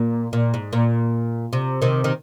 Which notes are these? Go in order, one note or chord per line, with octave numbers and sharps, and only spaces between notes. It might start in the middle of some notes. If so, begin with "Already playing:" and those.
Already playing: A#2
A#2
G#2
A#2
C3
C3 D#3
D#3